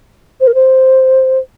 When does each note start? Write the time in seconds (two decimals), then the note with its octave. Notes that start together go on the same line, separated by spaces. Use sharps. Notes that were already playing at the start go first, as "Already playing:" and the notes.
0.41 C5
0.47 A#4
0.55 C5